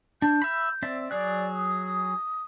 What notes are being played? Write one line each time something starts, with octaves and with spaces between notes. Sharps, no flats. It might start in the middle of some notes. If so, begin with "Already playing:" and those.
D4 G6
E5 B5
C4 D5 E5
F#3 G#4 D5 F#6
D#6